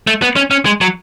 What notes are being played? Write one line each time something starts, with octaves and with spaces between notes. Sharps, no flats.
A3
B3
C#4
C#4
G#3
F#3